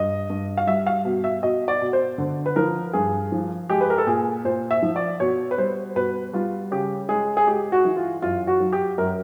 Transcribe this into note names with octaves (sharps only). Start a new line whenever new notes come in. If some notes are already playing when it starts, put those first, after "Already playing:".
Already playing: G2 D#5
G2
F5
G3 E5
F5
B2
E5
B2 D#5
D5
B2
C5
D3
B4
F3 A#4
G2 G#4
F3
G#3 G4
B4
A#4
A4
A#2 G#4
A#2 C5
E5
F3
D5
B2 C#5
B4
G3 C5
B2 B4
G3 F4
C#3 G4
G#3 G#4
G#4
G#3 G4
F#4
E3
F4
F#2 F4
F#4
F#3
G4
F#2 A#4